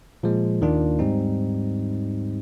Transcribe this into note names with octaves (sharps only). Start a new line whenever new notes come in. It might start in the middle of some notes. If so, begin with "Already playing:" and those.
A#2 F3 G#3
D#2 D#3 A#3 D4 F4
G#2 G3 C4 D#4